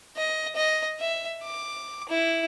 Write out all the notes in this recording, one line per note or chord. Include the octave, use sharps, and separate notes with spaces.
D#5
D#5
E5
D6
E4